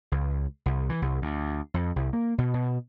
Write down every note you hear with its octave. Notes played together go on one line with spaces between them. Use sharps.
C#2
C2
E3
C2
D2
F2
C2
A#3
B2
B2